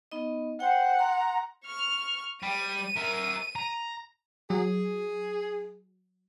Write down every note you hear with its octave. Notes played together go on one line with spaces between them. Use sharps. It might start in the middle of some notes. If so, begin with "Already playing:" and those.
B3 D#4 D#5
C5 F#5 G5
A#5 C6
C#6 F6
G3 D#7
A#4 E5
A#5
F#3 G#4